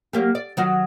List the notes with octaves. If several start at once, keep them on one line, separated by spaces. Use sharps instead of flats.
F#3 A#3 G4
D5
D#3 F#3 F#4